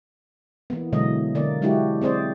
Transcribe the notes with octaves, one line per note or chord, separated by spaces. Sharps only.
E3 A#3 B3
B2 D3 E3 F#3 G#3 D#5
D3 A#3 D5
F#3 G#3 D4 E4 F#4 G4
C4 G#4 C5 D5